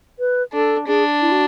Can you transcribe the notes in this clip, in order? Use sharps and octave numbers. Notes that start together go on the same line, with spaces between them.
B4
D4 A4
D4 G#4
E4
F#4